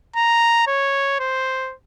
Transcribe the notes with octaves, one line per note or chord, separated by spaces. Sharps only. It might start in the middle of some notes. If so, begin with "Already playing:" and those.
A#5
C#5
C5